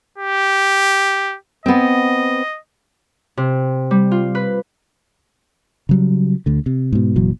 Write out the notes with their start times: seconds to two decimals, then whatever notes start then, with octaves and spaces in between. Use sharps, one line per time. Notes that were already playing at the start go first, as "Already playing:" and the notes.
0.18 G4
1.66 B3 C4 D#5
3.37 C3
3.91 G3
4.11 F4
4.35 B4
5.89 C#3 F#3 G3
6.46 D2 D3
6.66 C3
6.92 G#2 B2
7.16 F1 A#2 E3 F#3